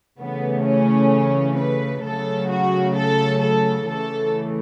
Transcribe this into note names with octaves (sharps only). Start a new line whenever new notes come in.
C#3 E3 A3 B3
C#4
B4
C#3 F#3 A3 A4
F#4
A4
A4
C#3 E3 A3 A4